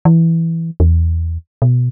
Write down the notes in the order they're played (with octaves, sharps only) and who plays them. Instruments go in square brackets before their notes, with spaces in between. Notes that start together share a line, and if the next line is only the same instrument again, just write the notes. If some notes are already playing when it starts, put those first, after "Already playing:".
[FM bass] E3
E2
B2